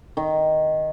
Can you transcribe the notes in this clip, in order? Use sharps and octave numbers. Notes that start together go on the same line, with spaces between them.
D#3